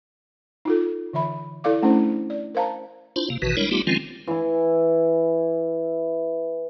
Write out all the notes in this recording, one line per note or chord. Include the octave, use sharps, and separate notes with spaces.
D#4 F4 A4
D3 E3 E5 B5
E4 A4 D5 F5 D6
A3 C#4 D4 E4 C5
D5
A#4 C5 F5 A5 A#5
D4 E4 F4 C5
C3 A#3
A1 B2 D#3 E3 F#4 B4
G3 G#3 D4 E4 A#4 C#5
G3 A3 B3 D#4 F4 G4
D#3 F3 G#3 C4 C#4 F4
E3 E4